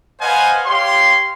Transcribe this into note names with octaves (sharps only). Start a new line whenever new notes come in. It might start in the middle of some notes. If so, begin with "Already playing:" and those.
B4 C5 D#5 F5 F#5 G#5
G4 C#5 F5 C6